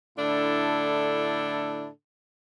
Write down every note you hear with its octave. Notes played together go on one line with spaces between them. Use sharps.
A2 D3 D4 E4 A4